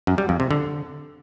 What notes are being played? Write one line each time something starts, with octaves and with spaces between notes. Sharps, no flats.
F#2
G3
F2
C3
D3